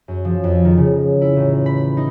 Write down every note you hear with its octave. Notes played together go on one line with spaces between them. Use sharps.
F#2
F3
F2
D#3
C#3
E4
A1
B5
D#4